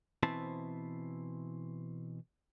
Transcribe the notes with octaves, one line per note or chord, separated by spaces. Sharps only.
B2 E3 C4 E4 C5 A5